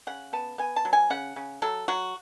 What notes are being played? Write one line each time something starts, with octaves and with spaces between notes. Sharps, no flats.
C#3 F#5
B3 A5
B3 G#5
A5
F#3
G#5
C#3 F#5
C#3
F#3 A4
F#3 F#4